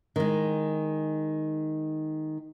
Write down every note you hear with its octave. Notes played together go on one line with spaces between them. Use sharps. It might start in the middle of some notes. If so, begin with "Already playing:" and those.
D#3 G#3